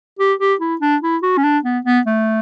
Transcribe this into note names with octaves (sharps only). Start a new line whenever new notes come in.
G4
G4
E4
D4
E4
F#4
C#4
D4
B3
B3
A3